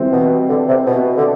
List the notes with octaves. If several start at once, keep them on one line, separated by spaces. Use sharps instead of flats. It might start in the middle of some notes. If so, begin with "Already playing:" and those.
Already playing: E3 G3 C4
B2
D3
C3
B2
D3